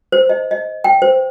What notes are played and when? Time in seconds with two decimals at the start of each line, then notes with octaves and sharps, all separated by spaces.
0.12 C5
0.29 D#5
0.51 D#5
0.84 G5
1.02 C5